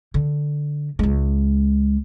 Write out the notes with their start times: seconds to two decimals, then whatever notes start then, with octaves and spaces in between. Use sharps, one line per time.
0.14 D3
0.99 C#2 G#3